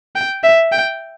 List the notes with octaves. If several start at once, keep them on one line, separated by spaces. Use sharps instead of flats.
G5
E5
G5